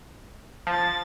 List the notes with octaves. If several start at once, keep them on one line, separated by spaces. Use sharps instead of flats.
F3 F4 A5 A6